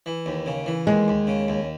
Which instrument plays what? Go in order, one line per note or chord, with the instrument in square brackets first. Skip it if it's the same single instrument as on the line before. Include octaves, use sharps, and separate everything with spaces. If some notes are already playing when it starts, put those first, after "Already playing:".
[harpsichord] E3
D#2
C#3
E3
[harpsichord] D#2 [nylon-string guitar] G#3
[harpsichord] D#2
C#3
D#2